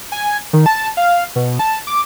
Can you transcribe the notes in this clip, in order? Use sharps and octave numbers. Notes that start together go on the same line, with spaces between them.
G#5
D#3
A5
F5
B2
A5
D6